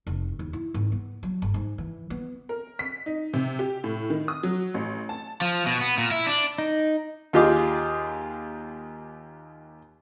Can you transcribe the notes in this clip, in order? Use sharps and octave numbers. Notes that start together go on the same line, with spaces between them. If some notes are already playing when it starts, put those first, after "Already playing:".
F1
D#2
E4
G#1
B3
F#3
G1
G#2
E3
B3
A#4
B6
D#4
C3
G4
A2
D#3
D#6
F#3
A1
A5
F3
B2
B3
A#2
E4
D4
D#4
D#2 F4 G4 G#4 D#5 D6